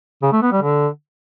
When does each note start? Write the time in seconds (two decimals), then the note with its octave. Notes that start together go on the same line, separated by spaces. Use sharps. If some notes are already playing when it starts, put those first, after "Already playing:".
0.23 C#3
0.32 A3
0.42 B3
0.52 G3
0.62 D3